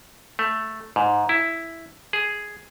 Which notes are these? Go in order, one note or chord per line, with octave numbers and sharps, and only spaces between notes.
A3
G#2
E4
G#4